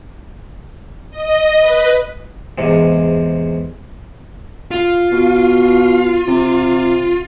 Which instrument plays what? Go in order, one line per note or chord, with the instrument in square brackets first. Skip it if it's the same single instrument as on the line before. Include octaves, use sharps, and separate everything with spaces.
[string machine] D#5
B4
[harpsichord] E2 G#2 C3
[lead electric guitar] F4
[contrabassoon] B2
C3